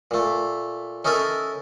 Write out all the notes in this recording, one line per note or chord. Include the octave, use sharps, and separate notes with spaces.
A#2 A3
C#4 D#4 E4 A4 A#4